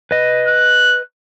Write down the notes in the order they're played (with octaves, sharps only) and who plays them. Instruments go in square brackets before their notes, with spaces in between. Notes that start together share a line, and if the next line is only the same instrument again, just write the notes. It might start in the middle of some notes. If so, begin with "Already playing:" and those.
[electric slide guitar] B4 D#5
[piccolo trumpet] F#6